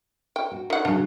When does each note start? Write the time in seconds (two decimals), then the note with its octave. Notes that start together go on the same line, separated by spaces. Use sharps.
0.36 G5
0.52 F#4
0.70 D#3 F#5
0.85 C#3 F#3 D4